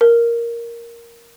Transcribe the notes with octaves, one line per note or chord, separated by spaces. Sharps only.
A#4